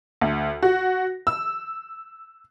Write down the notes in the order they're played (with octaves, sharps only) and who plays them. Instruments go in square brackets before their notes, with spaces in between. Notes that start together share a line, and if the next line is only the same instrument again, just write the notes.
[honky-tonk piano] D2
F#4
E6